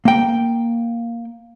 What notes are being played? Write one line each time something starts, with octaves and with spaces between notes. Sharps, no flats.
A#3 G5